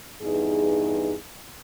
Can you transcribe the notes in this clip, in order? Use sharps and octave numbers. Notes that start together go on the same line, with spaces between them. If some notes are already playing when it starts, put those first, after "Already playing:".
E2 G2 D#4 G#4